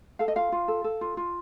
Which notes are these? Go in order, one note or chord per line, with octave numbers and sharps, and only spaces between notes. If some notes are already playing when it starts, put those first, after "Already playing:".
A4 F5
D#5
F4 F5
F4
A4
A4
F4
F4